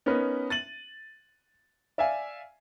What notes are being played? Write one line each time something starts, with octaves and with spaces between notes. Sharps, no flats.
B3 C#4 D#4 A#4 B4
A6 D#7 F#7
D5 E5 F5 G#5